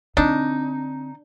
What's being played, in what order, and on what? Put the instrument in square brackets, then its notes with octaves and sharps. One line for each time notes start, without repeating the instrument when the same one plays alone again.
[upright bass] D3 C4 [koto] D4 [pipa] D#4